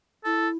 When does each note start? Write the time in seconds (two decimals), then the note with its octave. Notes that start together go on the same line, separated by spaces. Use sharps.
0.25 E4 A4